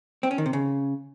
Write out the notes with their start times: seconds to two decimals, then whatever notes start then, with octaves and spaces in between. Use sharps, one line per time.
0.23 C4
0.31 C#4
0.38 D#3
0.46 C3
0.53 C#3